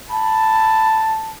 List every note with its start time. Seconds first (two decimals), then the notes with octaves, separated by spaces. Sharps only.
0.10 A5 B5